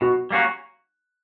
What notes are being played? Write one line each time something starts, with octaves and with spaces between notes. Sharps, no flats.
B2 F#4
G3 A#3 C#4 F#4